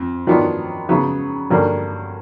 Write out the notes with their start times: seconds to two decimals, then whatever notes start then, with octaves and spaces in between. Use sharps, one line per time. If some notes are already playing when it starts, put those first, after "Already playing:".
Already playing: F2
0.27 D#3 F#3 B3 D4 F4
0.89 C#3 F#3 B3
1.50 G2 D3 F#3 A#3 D4